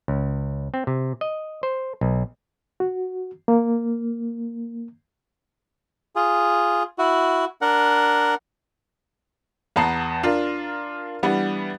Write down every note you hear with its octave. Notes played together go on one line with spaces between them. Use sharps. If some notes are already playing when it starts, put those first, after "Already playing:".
C#2
C4
C3
D#5
C5
B1
F#4
A#3
F4 G#4
E4 F#4
D4 A#4 F#5
E2 B3 A5 A#5 C7
D4 F4 A#4
E3 G3 B3 D4